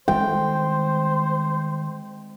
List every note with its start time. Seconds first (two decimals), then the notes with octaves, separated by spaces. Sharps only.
0.08 D#3 G3 G#3 C4 D4 C5 G5